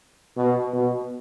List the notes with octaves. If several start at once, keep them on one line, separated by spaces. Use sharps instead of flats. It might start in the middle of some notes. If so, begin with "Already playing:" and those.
B2
B2